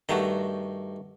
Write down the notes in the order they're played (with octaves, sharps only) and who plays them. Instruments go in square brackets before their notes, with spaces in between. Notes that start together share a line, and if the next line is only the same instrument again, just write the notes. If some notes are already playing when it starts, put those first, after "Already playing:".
[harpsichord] G2 A#5 C6 [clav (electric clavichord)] D#3 A3 F#4